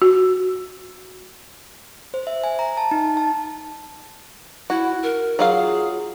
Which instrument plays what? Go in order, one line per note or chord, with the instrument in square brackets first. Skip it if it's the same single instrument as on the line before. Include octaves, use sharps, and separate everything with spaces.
[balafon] F#4
[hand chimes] C5
E5
G#5
A#5
A5
D#4
A5
[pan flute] E4 [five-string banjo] F#4
[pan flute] A#4
[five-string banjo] F#3 F4 F5 [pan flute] G#4